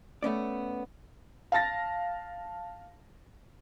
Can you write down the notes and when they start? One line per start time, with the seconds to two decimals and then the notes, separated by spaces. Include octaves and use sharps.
0.23 A3 B3 C#4 D5
1.52 F5 A5 A6 A#6